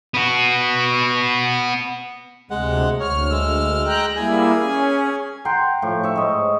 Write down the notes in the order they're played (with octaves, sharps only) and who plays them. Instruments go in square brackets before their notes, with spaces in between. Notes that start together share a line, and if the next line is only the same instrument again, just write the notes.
[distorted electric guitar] B3 F#4
[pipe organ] D2 C3 [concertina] G#3 F#5
[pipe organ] D2 F6 [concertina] C#5
[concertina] G#3 E6
[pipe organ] G5 A#5 F#6
[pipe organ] G3 A#3 E4 [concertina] G#4 G#5
[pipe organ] C#4
[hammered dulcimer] F#5 G5 A#5 C6
A2 F3
E5 C#6
G#2 D#5